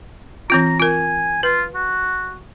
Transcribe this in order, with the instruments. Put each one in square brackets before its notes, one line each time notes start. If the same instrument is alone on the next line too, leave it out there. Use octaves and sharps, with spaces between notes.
[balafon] E3 C4 F4 [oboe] A#5
[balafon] F4 A#4 [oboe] G#5
[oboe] F4 [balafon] B4
[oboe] F#4